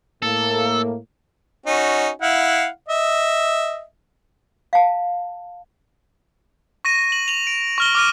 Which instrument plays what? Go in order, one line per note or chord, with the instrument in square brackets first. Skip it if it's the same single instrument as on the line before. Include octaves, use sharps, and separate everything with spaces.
[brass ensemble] A2 A#3 [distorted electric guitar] A4
[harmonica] C#4 D#4 F#4
E4 F5 F#5
D#5 E5
[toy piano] F5 A5
[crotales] C#6 A#6 D#7
F#7
F7 F#7
D7
C#6 F6 G7
D6 F6 D#7